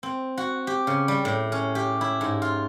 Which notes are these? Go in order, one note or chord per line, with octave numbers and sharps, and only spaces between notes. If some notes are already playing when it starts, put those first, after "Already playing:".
C4
F#4
G4
C#3
G3
A2
C#4
G4
E4
G#2
F4